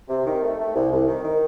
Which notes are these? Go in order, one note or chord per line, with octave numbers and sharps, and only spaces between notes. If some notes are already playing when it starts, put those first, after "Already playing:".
C3
D#3
A3
A3
C2
C2
D#3
D#3